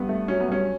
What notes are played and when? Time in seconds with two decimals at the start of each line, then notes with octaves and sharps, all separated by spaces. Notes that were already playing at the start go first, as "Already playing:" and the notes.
Already playing: G2 B3
0.09 A3
0.28 F#3 C#4
0.40 B3
0.49 G2 C#4